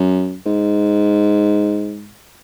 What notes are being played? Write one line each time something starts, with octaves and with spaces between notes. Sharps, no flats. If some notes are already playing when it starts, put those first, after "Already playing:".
Already playing: F#2
G#2